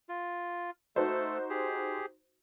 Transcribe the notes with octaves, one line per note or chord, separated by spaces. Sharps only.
F4
A3 D#4 F#4 A4 C5
G4 G#4